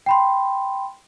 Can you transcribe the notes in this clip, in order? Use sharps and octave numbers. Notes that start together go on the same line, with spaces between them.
G5 B5 C6